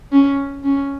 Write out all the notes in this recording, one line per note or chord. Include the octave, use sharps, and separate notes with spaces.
C#4
C#4